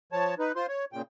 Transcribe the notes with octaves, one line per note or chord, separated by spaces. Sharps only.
F3 C#5 A5
D#4 B4
F4 C5 C6
C#5
A#2 C#3 G5